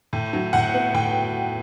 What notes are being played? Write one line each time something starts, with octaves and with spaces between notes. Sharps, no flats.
A2
F#3
A2 F#5
B3
A2 G5